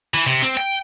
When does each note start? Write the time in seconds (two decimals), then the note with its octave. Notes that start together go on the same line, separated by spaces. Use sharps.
0.14 E3
0.26 C3
0.42 C4
0.57 G5